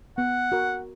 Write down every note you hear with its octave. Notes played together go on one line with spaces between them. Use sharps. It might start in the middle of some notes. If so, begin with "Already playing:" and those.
B3 F#5
F#4 A#4